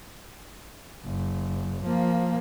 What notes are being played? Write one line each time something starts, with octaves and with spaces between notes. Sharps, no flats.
F#1
F3 A#3